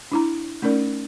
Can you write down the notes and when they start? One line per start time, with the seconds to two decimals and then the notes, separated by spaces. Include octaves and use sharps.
0.11 D4 E4 A#5
0.62 A3 C#4 D#4 A#4 D5